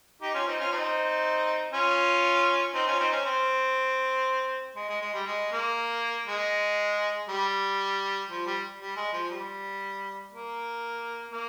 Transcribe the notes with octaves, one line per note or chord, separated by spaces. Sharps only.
D#4 G4
C#4 F4
C4 D#4
C#4 F4
C4 D#4
C#4 F4
C4 D#4
C#4 F4
C4 D#4
C#4
C4
G#3
G#3
G#3
G3
G#3
A#3
G#3
G3
F3
G3
G3
G#3
F3
G3
A#3
A#3